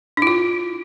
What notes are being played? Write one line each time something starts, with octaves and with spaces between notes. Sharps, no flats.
D4 E4 F4